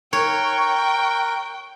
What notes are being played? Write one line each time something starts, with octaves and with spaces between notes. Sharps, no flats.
A#4 C#5 G5 C#6 F#6